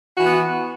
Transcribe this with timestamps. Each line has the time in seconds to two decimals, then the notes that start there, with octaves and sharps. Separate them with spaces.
0.16 F#4
0.20 E3
0.24 B3